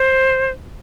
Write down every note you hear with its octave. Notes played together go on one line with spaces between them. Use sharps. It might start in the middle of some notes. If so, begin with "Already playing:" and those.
Already playing: C5